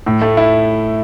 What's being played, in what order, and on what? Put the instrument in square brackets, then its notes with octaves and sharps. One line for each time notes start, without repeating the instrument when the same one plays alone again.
[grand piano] A2
A3
E4